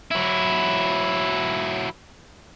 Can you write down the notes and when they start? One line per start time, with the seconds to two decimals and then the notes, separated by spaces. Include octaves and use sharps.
0.11 F#3 E4